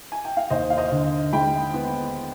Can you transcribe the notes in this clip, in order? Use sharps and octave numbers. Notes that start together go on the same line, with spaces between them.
G#5
G5
F5
D#2 C5 D#5
F5
C5 D#5
D3
G#3 G5 B5
B3